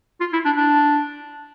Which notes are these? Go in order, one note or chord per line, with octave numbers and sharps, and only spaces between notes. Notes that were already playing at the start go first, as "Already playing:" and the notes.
F4
E4
D4
D4